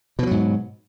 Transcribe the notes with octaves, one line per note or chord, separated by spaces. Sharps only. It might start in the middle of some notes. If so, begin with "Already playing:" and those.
G#2 B2 F3 F#3